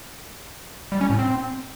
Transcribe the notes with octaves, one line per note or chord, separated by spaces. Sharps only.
G3
C#4
A2
C4